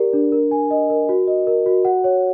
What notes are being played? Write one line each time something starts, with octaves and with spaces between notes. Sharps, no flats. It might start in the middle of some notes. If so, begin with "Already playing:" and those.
Already playing: G4 A#4 D5
D4
A#4
G#5
D#5
A#4
F#4
D#5
A#4
F#4
F#5
C#5